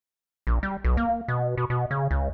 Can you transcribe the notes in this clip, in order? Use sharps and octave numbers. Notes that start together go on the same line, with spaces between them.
A#1
G3
B1
A#3
B2
B2
B2
C#3
C#2